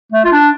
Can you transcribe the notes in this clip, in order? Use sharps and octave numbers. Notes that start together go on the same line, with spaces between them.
A3
F4
D4